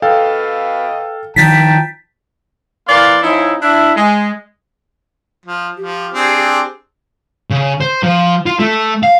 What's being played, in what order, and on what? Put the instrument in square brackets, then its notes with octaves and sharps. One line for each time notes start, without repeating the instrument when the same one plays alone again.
[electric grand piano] A4 F5 G5 [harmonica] B4 D#5
[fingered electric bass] D#3 F3 [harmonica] G5 A5 A#5 [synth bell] G6 A6 B6
[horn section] E3 A#3 D5 F5 C6
F3 C#4 D#4 E4
D4 E4
G#3
[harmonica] F3
[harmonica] F3 [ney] G4
[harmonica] C4 D4 G#4
[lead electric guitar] C#3
C5
F3
F4
A3
F5